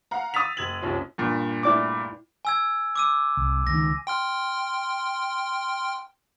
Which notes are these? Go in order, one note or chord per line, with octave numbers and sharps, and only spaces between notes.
F5 F#5 A#5
D#6 E6 A6 B6 F7
F#1 G#6 F7 F#7
F#1 C2 C#4 F4
G2 A#2
E4 D5 D6
G#5 E6 G#6
D6 E6 D#7
C2
C#2 D#3 A#6
G5 C6 F6